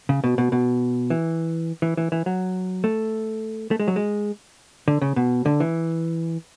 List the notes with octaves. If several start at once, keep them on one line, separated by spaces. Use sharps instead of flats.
C#3
B2
B2
B2
E3
E3
E3
E3
F#3
A3
A3
G#3
F#3
G#3
D3
C#3
B2
D3
E3